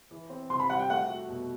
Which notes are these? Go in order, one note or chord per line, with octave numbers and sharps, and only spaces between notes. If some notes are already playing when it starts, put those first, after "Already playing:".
E3
C4
C3 C6
B5
G3 F#5
G5
A3 F#5
F#4
B2